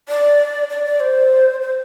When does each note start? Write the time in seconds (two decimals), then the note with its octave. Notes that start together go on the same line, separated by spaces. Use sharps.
0.09 D5
0.70 D5
0.85 D5
1.00 C5
1.62 C5